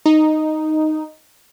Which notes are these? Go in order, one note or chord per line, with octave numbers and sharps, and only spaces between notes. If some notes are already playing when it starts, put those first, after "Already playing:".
D#4